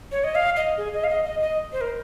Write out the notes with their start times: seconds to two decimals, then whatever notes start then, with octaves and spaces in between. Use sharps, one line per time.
0.12 C#5
0.24 D#5
0.35 F5
0.56 D#5
0.77 G#4
0.94 D#5
1.04 F5
1.09 D#5
1.25 D#5
1.41 D#5
1.73 C5
1.81 A#4